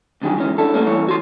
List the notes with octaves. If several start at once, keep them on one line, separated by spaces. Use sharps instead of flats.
C2 F2 D3 D#3 F#3 G#4
E3 G#3 C#4
D4 E4 A4
F2 A3 A#3 C#4
G2 E3 C#5 E5
E3 F#4 C6